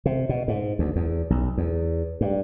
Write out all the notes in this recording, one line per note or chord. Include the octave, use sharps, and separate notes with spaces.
C3
B2
G#2
D2
E2
B1
E2
G2